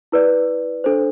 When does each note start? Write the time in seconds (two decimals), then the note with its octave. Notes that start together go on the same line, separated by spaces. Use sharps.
0.12 E4 B4 D5
0.84 D4 A4 C5